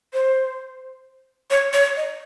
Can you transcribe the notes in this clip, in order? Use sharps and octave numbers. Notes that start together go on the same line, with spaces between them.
C5
C#5
C#5
D#5